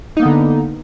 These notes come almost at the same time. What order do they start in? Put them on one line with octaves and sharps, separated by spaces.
D#4 A#3 B3 D3